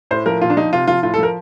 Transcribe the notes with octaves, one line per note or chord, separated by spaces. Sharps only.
A2 C5
F3 A#4
A#2 F4
D4
F3 D#4
C3 F4
F3 F4
A2 F4
A4
F3 A#4